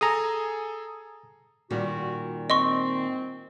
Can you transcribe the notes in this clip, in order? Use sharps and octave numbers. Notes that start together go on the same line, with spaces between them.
G#4 A4 G#5 A#5 D#6
A#2 D#3 G3 F#4
C4 D#5 C6 C#6